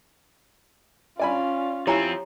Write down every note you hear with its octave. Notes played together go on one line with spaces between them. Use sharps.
C#4 F4 D5 G#5 B5
F3 C4 E4 G4 C#5 G#5 A#5